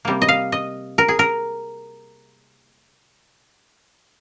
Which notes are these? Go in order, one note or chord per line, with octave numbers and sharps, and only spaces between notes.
C3 G3 A#3
D#5
F5
D#5
A#4
G#4
A#4